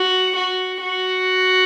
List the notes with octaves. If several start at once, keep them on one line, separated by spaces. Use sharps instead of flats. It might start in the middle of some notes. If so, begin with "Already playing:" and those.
Already playing: F#4
F#4
F#4